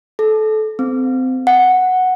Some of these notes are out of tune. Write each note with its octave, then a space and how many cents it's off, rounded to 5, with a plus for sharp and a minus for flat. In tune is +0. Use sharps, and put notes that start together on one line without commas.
A4 -25
C4 -25
F#5 +0